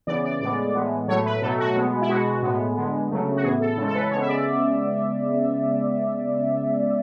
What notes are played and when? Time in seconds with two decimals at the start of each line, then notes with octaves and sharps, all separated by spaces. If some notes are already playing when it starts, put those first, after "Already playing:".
0.07 C#3 E3 B3 D5
0.24 D5
0.41 A2 G#3 B3 D5
0.75 A2 E3 G#3 B3
1.08 A2 F#3 A3 C#5
1.25 B4
1.41 B2 F#3 A3 A4
1.59 F#4
1.75 B2 G#3 B3
2.01 E4
2.09 B2 G#3 B3 F#4
2.43 A2 G#3 B3
2.76 D3 G#3 B3
3.10 C#3 F#3 A3
3.36 F#4
3.43 A2 E3 B3 G#4
3.61 A4
3.77 C#3 E3 G#3 A4
3.88 A4
3.95 B4
4.11 C#3 G#3 B3 C#5
4.21 E5
4.28 D5